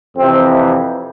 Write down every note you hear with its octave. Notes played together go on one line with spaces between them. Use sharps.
F2 C3 E3 C4